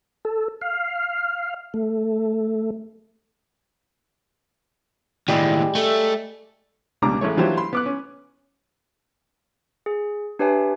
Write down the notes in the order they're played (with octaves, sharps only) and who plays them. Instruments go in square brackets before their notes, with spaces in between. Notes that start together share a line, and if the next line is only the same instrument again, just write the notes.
[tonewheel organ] A4
F5
A3
[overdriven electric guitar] D#2 A2 [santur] G3 G#3 G4
[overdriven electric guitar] A3
[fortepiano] C#2 B2 G3 D4 A#5 D6
A1 G#3 A3 C#5
E3 F#3 D4 F4 G4 C5
B5 C6
B3 D6 F#6
C#4
[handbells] G#4
D4 G4 B4 C#5 E5 G#5